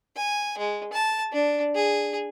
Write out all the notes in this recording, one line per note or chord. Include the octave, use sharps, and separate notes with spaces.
G#5
G#3
A5
D4
G#4